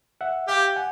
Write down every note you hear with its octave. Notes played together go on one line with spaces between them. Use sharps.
E5 F#5
G4 F5 G5
F#5 G#5